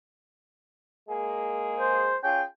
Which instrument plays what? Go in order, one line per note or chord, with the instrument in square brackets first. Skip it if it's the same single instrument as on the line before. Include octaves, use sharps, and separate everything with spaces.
[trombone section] G#3 A#3 G#4
[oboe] C5
[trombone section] C#4 F4 G#4 [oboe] G5